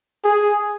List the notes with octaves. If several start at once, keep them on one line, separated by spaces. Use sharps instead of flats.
G#4